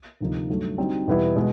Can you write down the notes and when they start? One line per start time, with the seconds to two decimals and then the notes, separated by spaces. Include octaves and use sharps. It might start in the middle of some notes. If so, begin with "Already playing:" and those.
0.21 D2 C3 F3 A#3 D#4
0.49 G2 D3 F#3 A3
0.78 D3 G3 C4 D#4 F#4
1.07 E2 B2 G3 B3 E4
1.36 B2 G#3